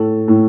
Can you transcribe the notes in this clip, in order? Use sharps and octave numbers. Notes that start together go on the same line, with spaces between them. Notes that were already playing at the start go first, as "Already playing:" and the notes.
Already playing: A2 A4
A2